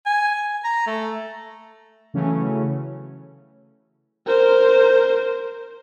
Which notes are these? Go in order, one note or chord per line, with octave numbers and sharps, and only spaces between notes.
G#5
A#5
A3
C#3 E3 F#3 A3 C#4
A#4 C5